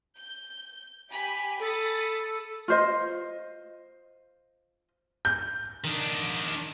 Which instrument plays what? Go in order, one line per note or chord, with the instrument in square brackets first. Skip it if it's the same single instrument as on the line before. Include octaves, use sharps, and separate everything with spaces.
[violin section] G6
G4 G#5 B5
[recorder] A4 [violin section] B5 D#6 A6
[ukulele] F4 C5 D#5
[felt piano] G6
[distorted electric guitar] D#3 D4